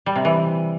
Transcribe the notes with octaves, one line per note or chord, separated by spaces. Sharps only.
G3
C3
E3